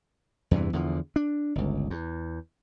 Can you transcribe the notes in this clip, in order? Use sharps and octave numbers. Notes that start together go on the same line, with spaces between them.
E2 G2 C3 E3
E2 D3 F3
D4
G1 C#2
E2